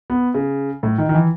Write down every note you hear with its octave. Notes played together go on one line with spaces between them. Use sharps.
B3
C#3
A2
D#3
D#3
E3